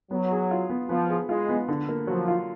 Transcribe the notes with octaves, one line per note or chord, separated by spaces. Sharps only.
F#3 B3
G#4
F4
B3
F3 B3
G#4
G#3 F4
B3
D3
A#3
F3 F#3
F4